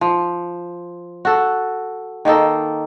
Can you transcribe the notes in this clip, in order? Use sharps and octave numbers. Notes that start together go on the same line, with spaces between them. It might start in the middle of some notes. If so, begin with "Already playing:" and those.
F3
F#4 A4
D#3 A#3 D#4 A4